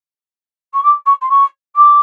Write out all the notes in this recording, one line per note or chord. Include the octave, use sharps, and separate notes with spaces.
C#6
D6
C#6
C6
C#6
D6